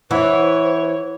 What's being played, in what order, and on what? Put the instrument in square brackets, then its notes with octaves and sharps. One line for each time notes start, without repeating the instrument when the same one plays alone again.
[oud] E3 [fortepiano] E4 F#5 [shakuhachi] C5 [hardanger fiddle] C#5